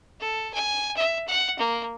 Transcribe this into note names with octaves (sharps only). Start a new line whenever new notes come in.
A4
G#5
E5
F#5
A#3